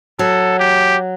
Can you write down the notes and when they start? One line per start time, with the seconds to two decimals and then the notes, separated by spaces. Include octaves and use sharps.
0.19 F#3 A4
0.59 G4